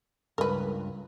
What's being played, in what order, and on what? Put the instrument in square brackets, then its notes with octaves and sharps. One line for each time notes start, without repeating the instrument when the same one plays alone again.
[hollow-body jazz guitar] C#2 G2 [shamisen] A#4 B4